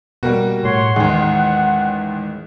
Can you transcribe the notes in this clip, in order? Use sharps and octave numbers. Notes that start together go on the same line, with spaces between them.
B2 G3 A#3 F#4
A2 C#5 F#5 C6
A1 D#2 G#3 F#5